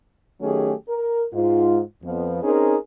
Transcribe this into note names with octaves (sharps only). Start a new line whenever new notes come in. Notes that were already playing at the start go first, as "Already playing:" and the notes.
D#3 F#3 A3 C#4 G4 G#4
A#4
G#2 F4
F2 F3 B3
C4 C#4 D#4 G#4 A#4 C5